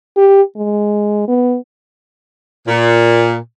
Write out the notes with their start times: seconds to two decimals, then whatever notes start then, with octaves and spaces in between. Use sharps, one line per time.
0.17 G4
0.56 G#3
1.28 B3
2.67 A#2